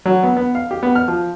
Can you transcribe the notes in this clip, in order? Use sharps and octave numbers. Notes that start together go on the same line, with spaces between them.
F#3
B3
B3
F5
G4
B3
F6
F3